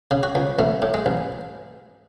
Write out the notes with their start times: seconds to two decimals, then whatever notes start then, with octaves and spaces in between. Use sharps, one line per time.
0.11 C#3
0.23 F#4
0.35 C#2
0.59 A1 A3
0.82 A2
0.94 G#3
1.06 A1